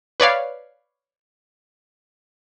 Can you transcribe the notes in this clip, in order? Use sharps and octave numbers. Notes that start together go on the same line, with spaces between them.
B4 C#5 D5 F5